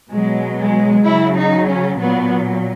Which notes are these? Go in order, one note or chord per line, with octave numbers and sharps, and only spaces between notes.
B2 F#3 G#3
G#3
C#3 F#3 E4
D#4
C#4
A#2 F#3 B3